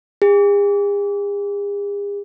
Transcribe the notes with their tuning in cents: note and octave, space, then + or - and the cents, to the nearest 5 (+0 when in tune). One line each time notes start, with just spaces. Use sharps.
G#4 -45